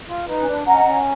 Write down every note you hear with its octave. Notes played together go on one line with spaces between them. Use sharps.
F4
D#4 B4
C#4
D4
C#4 D#5 F#5 A#5
C#4